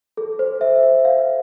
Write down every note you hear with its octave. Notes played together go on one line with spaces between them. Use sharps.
A4
C5
E5
E5
F5